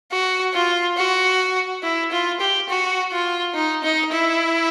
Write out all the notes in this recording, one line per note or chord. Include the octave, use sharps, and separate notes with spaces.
F#4
F4
F#4
E4
F4
G4
F#4
F4
D#4
D#4
E4